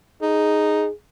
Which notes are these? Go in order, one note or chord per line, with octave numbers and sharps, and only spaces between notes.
D#4 G#4